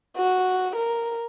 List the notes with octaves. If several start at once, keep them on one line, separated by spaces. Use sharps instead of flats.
F#4
A#4